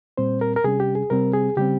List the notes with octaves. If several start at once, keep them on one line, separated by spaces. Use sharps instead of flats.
A#2 G3 C4 C5
A#4
A#4
C3 G3 C#4 G#4
G4
G#4
C3 G3 C4 A#4
G#4
C#3 G3 C4 G4